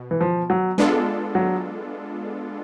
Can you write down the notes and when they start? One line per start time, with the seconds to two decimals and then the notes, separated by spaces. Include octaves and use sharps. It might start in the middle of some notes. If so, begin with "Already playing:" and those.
Already playing: B2
0.11 E3
0.21 F3
0.50 F#3
0.78 G#3 B3 D4 F4 A4
1.35 F#3